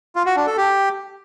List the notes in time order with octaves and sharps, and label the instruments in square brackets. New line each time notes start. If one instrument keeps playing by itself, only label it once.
[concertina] F4
F#4
D4
A4
G4